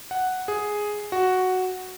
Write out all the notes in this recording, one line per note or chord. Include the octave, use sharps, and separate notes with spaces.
F#5
G#4
F#4